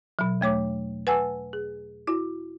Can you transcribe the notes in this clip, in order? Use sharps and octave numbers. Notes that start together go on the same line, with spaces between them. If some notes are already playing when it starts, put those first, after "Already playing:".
B2 F#3
E2 A3 C#5 D6
B4 F#5 G#5 A5 E6
G#4
E4 F#4